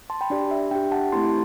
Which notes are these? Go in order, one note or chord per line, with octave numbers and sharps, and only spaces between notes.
A5 C6
G5 B5
D4 G4 D5
E5
D4 G4 E5 G5
F#5 A5
A3 C4 E4 G4 A5 C6